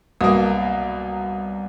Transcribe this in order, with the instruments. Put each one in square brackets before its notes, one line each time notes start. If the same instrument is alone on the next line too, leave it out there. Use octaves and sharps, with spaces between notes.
[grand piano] C2 B2 F#3 A#3 D#6